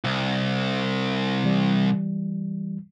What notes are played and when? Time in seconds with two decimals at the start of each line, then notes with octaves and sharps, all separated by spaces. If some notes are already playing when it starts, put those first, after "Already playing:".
0.04 C2
1.44 E3 G3